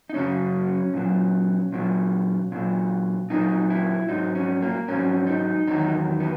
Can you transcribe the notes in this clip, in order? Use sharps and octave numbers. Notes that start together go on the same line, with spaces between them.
D#4
F#2 C#3 F#3 C#4
A#2 F#3
A#2 F#3
A#2 F#3
A#2 F#3 D#4
E4
G#2 F#3 D#4
C#4
A#3
G#2 F#3 C#4
D#4
E2 D#3 F#3 D#4
B3